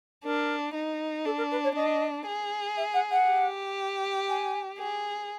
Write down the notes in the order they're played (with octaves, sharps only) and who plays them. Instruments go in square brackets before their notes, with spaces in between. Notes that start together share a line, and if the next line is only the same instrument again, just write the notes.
[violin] D4 [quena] A#4
[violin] D#4
[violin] D4 [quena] A4
[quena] A#4
B4
C#5
[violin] D4 [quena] D#5
[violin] G#4
[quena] E5
F#5
F#5
[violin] G4
[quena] G#5
[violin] G#4